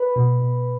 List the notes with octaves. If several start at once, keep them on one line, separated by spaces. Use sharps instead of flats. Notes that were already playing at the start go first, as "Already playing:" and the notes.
Already playing: B4 B5
B2
B2